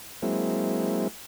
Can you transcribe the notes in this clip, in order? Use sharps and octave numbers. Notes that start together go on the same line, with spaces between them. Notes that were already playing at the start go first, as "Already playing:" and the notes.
F#3 G#3 A#3 C4 E4